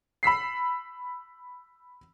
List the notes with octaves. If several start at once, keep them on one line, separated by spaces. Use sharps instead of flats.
B5 E6 B6 C7